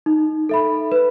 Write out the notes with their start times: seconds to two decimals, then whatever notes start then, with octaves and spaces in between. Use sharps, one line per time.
0.06 D#4
0.49 A4 E5 B5
0.92 B4